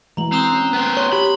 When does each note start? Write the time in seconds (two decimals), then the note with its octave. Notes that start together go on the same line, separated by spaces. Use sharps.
0.17 E3 G#3 A#5 F#7
0.32 C4 A#5 D#6 F#6
0.52 C#4
0.73 B3 C5
0.97 C#5 C6
1.13 G4 B5